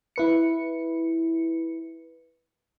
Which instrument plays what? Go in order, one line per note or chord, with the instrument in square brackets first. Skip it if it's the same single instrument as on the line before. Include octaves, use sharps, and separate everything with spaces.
[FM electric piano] E4 B4 C#7